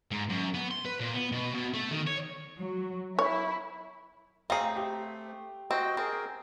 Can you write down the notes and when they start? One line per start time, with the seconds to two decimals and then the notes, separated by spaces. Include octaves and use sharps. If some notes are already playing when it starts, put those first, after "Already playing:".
0.11 G#2
0.29 F#2
0.54 B3
0.71 C6
0.85 B4
1.00 A#2
1.14 B3
1.32 B2
1.54 B2
1.74 A3
1.91 D#3
2.07 C#5
2.60 F#3
3.19 E4 C#5
4.50 A3 C4 G#4 F5 A#5 C7
4.76 G4
5.71 C4 F#4 D#5 G5
5.97 C4 G#4 A#4